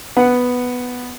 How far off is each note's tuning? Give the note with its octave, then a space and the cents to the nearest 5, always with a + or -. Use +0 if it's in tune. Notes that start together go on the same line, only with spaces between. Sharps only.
B3 +0 F#5 +0